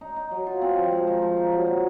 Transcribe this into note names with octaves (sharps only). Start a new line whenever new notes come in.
D#4
D#4
F#3
F4
C4
F3
G#3
D#3
F3
D#4
F#3
A#2